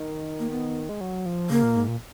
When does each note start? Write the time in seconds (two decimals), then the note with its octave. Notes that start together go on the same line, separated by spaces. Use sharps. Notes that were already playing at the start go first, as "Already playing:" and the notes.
Already playing: D#3
0.39 A#3
0.50 B3
0.89 G#3
1.01 F#3
1.26 F3
1.50 C#3 A#3
1.63 A#2
1.76 G#2
1.88 A#2